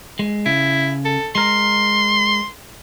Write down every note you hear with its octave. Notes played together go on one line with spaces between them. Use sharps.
G#3
C#3 E4
A4
G#3 A#4 C6